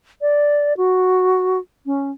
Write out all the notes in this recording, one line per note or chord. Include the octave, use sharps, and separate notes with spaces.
D5
F#4
C#4